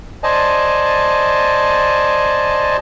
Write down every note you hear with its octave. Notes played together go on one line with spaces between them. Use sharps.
C5 D5 D#5 G#5 A5